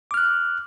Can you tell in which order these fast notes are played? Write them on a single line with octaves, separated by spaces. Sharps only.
D6 F6 F#6